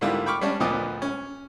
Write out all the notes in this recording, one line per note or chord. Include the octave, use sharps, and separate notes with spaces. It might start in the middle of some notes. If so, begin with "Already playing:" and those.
G#2 D3 G3 A#3 E4 F4
G5 B5 C#6 D6 F6
G3 C#4 D4
D2 A#2 F3 B3 D#5 D6
C#4